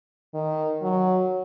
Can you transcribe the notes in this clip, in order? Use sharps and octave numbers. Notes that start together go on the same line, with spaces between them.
D#3
F#3